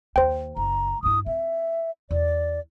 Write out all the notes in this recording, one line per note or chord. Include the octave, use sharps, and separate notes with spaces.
D#2 C5 G5
F#1 A#5
G2 E4 D#6
C4 E5
E2 D5